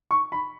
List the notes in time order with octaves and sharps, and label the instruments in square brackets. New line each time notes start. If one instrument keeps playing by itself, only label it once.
[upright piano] C#6
B5